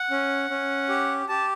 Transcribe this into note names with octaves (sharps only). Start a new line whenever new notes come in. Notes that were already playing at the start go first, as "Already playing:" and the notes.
Already playing: F#5
C#4
C#4
G4
G4 A5